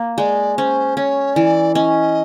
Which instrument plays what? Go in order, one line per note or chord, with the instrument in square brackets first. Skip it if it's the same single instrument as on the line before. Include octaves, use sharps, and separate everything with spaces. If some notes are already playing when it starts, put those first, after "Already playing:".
Already playing: [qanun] A#3
[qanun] G#3 [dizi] D5
[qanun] C#4 [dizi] C5
[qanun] C#4 [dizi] C#5
[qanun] E3 [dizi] D5
[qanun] C#4 [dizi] D#5